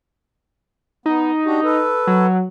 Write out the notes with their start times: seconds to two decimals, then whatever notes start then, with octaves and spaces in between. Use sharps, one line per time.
1.06 B3 D#4
1.45 D4 F#4 G4
1.64 A4 B4
2.07 F#3